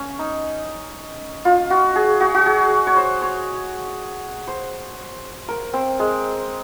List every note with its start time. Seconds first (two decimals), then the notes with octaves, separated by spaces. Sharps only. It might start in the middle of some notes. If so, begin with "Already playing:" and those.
Already playing: C#4
0.19 D#4
1.45 F4
1.70 F#4
1.96 G#4
2.21 F#4
2.34 F#4
2.46 G#4
2.87 C#5
2.96 C5
3.21 C#5
4.47 C5
5.48 A#4
5.73 C4
5.99 G#3